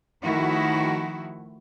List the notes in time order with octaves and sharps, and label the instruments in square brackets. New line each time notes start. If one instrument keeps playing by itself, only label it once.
[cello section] D#3 F3 A3 E4 F#4